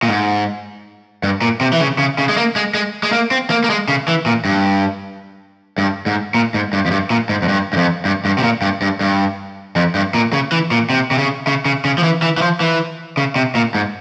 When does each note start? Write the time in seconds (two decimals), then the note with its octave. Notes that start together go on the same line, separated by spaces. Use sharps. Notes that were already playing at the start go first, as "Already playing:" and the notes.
0.03 A#2
0.09 G#2
1.23 G2
1.41 A#2
1.61 C3
1.73 E3
1.81 C#3
1.98 C#3
2.18 C#3
2.29 G#3
2.37 A#3
2.56 G#3
2.74 G#3
3.03 G#3
3.12 A#3
3.31 C4
3.50 A#3
3.64 A#3
3.70 G#3
3.88 C#3
4.08 E3
4.26 A#2
4.45 G2
5.78 G2
6.06 G#2
6.34 A#2
6.54 G#2
6.73 G2
6.86 F2
6.91 G2
7.10 A#2
7.29 G#2
7.42 F2
7.48 G2
7.73 G2
7.77 F2
8.05 G2
8.25 G2
8.38 C3
8.43 A#2
8.62 G2
8.82 G2
9.01 G2
9.76 F2
9.95 G2
10.15 A#2
10.33 C#3
10.52 E3
10.71 A#2
10.90 C3
11.11 C3
11.18 C#3
11.47 C#3
11.65 C#3
11.85 C#3
11.98 F3
12.04 E3
12.22 E3
12.37 E3
12.42 F3
12.60 E3
13.17 C#3
13.36 C3
13.55 A#2
13.75 G#2